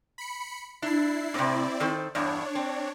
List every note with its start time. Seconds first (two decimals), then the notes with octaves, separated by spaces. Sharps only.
0.18 B5 C#7
0.82 D4 E4 C7
1.34 A2 C3 C4 E4 D5
1.80 D#3 A4 C5
2.15 E2 G2 D4 C#5
2.55 C4